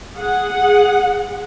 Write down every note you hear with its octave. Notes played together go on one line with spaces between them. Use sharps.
G#4 F#5